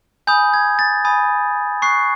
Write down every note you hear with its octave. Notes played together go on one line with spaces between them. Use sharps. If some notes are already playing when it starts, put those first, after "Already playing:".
G#5 B5 D#6 G6
G#6
A6
G#5 B5 D#6
C#6 F#6 C7